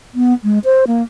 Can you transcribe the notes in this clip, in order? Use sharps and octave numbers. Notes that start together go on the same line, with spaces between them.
B3
G#3
C5
A#3